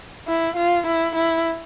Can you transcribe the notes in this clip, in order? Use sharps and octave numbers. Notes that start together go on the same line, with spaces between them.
E4
F4
E4
E4